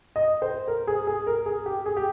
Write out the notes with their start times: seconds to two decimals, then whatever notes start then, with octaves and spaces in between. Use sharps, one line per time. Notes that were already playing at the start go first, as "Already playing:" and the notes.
0.16 D#5
0.42 C5
0.68 A#4
0.87 G#4
1.07 G#4
1.27 A#4
1.46 G#4
1.66 G4
1.86 G#4
1.97 G4